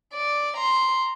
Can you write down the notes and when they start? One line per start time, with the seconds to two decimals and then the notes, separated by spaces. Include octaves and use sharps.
0.14 D5
0.57 A#5 C6